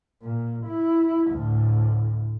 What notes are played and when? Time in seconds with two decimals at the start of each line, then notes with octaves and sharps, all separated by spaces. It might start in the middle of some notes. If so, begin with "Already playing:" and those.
0.22 A#2
0.66 E4
1.31 D2 A2